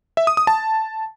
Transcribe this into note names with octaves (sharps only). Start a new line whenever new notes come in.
E5
D#6
D#6
A5